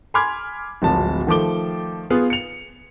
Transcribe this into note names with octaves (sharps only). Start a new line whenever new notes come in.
G#5 B5 C6 D6 F6 G#6
D1 G#1 F3 A5
D#3 F3 A3 D6 G7
B3 F4 G#4 F5
C#7 F7